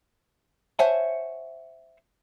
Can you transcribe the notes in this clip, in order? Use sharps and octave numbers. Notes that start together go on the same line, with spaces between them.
C5 C#5 E5 F#5 G#5 A5